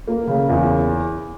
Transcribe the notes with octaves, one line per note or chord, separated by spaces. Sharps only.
A#3
C#3
E2